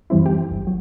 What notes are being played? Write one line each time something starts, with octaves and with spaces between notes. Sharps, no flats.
F#2 E3 G3 C4 E4
G4
G1
F#3